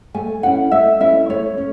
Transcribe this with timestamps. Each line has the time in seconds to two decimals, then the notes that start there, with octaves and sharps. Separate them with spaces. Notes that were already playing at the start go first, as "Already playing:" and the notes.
0.14 A3 G#5
0.43 C#4 E4 F#5
0.71 A3 E5
1.00 C#4 E4 E5
1.29 A3 C#5
1.58 C#4